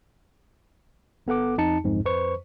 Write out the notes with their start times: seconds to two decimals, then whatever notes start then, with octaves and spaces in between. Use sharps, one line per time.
1.27 G1 B3 A4 F#5 D6
1.58 F2 D#4 A5 C#7
1.84 B1 F2 G#2
2.05 F2 B4 C5 C#6